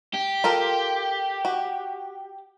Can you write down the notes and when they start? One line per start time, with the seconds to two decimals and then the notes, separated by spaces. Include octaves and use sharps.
0.14 G4
0.44 F4 A4 A#4
1.45 F#4